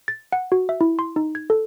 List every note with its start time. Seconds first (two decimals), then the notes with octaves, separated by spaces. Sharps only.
0.08 A6
0.32 F#5
0.52 F#4
0.69 E5
0.81 E4
0.99 C6
1.16 D#4
1.35 G#6
1.50 A4